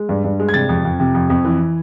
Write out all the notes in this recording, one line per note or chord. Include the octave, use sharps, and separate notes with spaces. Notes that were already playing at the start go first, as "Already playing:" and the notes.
Already playing: G#3
G2
G2
G#3
G#6
C3 A6
F2
F2
C3
F2
F2
E3